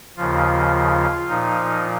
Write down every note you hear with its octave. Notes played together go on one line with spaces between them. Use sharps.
D#2 C#3 F3 F4
A#2 F3 D#4